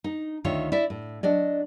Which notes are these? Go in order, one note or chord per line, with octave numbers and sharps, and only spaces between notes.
D#4
D2 D#3 F4 C#5 E5
E4 D5 E5
A2
F#3 D4 D5 D#5